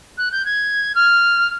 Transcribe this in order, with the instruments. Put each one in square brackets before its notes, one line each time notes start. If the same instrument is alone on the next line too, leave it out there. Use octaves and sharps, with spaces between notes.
[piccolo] F#6
G6
G#6
F6